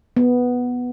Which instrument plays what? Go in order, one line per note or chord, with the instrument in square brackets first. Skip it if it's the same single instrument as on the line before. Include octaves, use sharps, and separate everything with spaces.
[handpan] B3